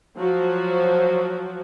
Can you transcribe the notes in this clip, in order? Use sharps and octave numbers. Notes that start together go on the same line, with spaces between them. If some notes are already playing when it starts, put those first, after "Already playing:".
F3 F#3 F#4